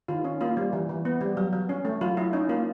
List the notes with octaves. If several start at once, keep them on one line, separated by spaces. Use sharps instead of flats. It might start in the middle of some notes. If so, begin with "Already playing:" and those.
D#3 F4
C#4
A#3 F4
G3
E3
E3
B3
G3
F#3
F#3
C#4
A3
F#3 F4
F#3 E4
C#4 D#4
A#3 F4